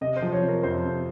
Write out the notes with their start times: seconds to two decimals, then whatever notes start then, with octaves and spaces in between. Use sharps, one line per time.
0.01 C3 D#5
0.16 C5
0.22 F3
0.33 C#5
0.42 C3
0.48 A#4
0.63 F2 C5
0.85 C3